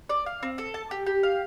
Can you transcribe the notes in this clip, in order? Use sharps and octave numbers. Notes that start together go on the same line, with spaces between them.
D5
F5
C4
A4
A5
G4
G4
F5